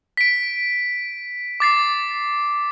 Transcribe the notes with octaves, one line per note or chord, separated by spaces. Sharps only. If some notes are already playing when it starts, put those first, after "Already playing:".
B6 D7
D6 A6 C7